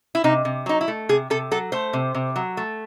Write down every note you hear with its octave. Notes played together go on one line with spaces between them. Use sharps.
E4
C3 D#4
C3
F#3 D#4
E4
A3
C3 G#4
C3 A4
F#3 A4
A3 C5
C3
C3
F#3
A3